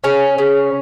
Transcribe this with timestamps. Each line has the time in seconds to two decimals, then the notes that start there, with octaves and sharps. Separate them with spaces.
0.04 C#3 C#4
0.38 C#3